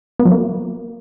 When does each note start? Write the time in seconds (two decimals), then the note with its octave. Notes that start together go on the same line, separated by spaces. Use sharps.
0.19 B3
0.25 F#3
0.31 A#3